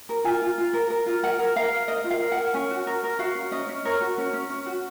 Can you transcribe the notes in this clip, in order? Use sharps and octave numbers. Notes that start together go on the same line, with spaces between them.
A#4
F4 G#5
F4
F4
A#4
A#4
F4
A#4 F#5
A#4
A#4 F5
A#4
A#4 D#5
F4
F5
A#4
F#5
A#4
C#4 G#5
F#4
A#4
A#4
F#4 F5
C#4
C#4 D#5
C#4
A#4 C#5
F#4
C#4
C#4
C#4
F#4